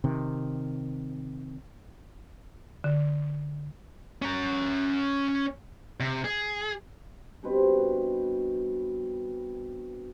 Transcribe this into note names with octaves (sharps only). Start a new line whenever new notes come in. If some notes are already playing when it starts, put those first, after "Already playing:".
C3 D#3
D3
C#4 A#5
C3
G#4
G2 B2 C4 B4